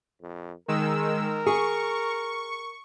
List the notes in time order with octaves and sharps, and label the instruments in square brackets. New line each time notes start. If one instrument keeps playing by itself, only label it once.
[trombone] F2
[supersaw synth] D#3 G#3 E6 [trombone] A#4
[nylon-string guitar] G#4 [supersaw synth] C#6